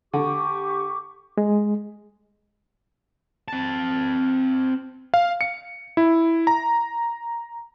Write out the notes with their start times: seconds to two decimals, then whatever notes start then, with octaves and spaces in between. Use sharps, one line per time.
0.14 D3 G4 C#6 D6
1.38 G#3
3.48 C4 A5
5.14 F5
5.41 C#7
5.97 E4
6.47 A#5